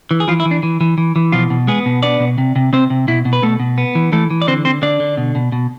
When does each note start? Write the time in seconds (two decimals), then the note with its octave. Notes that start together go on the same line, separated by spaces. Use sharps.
0.11 E3
0.20 G#4
0.28 E3 F3 F4
0.40 E4
0.46 E3
0.51 D4
0.63 E3
0.81 E3
0.98 E3
1.16 E3
1.32 B2 F3 F4
1.50 B2
1.67 G#3 B3 G#4
1.86 B2
2.03 B3 D4 D5
2.20 B2
2.38 C3
2.56 C3
2.73 C3 C4 C5
2.90 C3
3.08 B2 E4
3.25 B2
3.33 B4
3.42 B2 A3 A4
3.60 B2
3.78 B3
3.95 E3
4.12 E3 A3 A4
4.30 E3
4.42 D5
4.47 D3 C4 C5
4.65 D3 C4 C5
4.82 D3 D4 D5
5.00 D3
5.17 B2
5.35 B2
5.52 B2